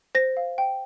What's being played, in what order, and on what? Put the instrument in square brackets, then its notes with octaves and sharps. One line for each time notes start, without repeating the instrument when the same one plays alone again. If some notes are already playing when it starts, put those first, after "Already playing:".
[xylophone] C5 A#6
F5
G5